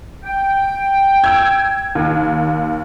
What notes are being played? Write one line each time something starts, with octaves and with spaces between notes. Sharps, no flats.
G5
E6 G#6
D#2